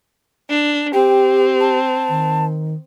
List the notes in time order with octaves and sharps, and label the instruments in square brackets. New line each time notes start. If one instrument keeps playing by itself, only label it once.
[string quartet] D4
[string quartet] C4 [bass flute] G4 [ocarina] G5
[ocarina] A5
[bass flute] D#3